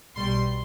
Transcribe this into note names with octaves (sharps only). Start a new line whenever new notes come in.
B1 B2 G3 C6